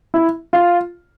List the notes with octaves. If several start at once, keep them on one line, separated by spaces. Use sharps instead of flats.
E4
F4